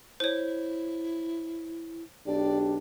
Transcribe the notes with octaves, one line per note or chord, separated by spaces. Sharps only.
E4 C5 C#5
B1 D4 G4 D5